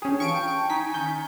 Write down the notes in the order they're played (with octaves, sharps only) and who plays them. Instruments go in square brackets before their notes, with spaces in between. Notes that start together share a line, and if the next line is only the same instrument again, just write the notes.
[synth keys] C#4 G#4 [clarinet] D4 [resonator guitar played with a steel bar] G4
[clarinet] E3 [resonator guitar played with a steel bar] F4 A5 [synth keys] C#6 D7
[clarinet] G5
[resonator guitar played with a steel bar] D#4 [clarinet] G#5 [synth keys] B6
[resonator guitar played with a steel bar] D#3 C#4 [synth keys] G6